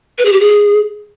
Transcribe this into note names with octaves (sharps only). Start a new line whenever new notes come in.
B4
G#4
G4
G#4